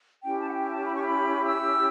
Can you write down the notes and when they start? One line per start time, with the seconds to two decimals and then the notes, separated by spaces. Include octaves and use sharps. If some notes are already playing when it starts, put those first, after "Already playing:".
0.23 C#4 E4 G4 G5
0.39 A5
0.49 F#5
0.54 G5
0.70 A5
0.85 B5
0.95 C#6
1.04 B5
1.47 E6